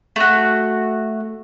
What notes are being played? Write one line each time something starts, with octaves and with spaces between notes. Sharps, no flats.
A3 F#4